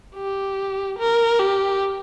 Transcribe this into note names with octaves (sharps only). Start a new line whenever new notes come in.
G4
A#4
G4